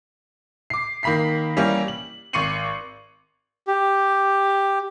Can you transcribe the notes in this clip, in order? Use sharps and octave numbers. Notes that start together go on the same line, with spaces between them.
D6 C7
D#3 A#3 B5 B6 C7
E3 G3 A#3 C#4 E4
F#7
G#1 C#6 C7 C#7 D#7 F#7
G4